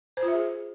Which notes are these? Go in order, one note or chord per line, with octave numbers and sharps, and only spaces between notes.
C5
F4
E5
G#4